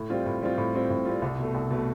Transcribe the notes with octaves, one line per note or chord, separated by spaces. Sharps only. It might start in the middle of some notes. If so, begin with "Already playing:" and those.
Already playing: A2
G3 C4 F4
A2
G3 C4 F4
A2
G3 C4 F4
A2
G3 C4 F4
C2
B2 A3
C2
B2 A3